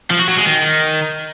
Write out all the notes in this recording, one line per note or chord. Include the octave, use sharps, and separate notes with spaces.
F3
F#4
F#3
G#3
D#3